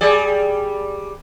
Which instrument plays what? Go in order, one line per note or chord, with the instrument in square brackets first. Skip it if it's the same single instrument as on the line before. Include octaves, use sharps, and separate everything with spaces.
[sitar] G3 G#4 D5